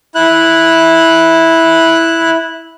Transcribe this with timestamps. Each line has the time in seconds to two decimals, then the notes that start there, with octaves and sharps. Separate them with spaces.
0.15 E4 F#6